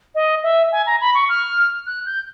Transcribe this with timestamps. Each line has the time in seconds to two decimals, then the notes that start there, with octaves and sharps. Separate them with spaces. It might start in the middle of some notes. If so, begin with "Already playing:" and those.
0.15 D#5
0.43 E5
0.72 G#5
0.86 A#5
1.01 B5
1.15 C#6
1.29 F6
1.87 F#6
2.06 G6